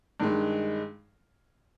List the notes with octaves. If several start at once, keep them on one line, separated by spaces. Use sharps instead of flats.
G2 D#3 G#3